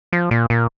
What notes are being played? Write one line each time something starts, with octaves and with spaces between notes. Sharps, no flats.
F3
A#2
A#2